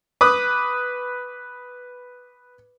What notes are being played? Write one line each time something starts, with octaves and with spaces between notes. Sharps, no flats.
B4 D6 D#6